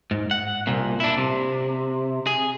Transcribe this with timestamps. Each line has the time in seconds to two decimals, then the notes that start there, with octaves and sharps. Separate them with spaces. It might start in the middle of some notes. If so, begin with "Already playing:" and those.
0.11 G#2
0.31 F#5
0.67 C2 A#2
1.00 D4 E4
1.18 C3
2.27 G#4